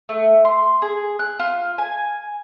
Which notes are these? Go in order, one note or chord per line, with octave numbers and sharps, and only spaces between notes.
A3
C6
G#4
F#6
F4
G#5